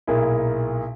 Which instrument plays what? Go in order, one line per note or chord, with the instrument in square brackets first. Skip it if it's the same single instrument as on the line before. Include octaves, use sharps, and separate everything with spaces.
[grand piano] B1 A#2 A#3 E4 G#4